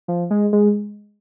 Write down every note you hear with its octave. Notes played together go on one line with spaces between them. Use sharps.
F3
G#3
G#3